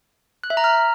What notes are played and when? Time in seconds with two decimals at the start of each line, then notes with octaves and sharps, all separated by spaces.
0.44 F#6
0.50 E5
0.57 A#5
0.64 F6